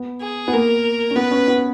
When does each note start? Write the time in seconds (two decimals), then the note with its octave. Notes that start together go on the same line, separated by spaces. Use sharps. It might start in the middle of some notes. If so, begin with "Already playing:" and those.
Already playing: B3
0.21 G#4
0.48 B3
0.53 A#3 A#4
1.11 C#4
1.16 B3 B4
1.31 C#4
1.48 B3